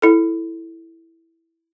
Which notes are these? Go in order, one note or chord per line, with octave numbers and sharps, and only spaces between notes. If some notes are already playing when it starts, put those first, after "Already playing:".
E4 A4